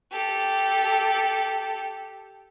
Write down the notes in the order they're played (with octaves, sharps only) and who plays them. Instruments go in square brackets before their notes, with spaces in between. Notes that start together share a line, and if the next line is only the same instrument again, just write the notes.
[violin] G4 A4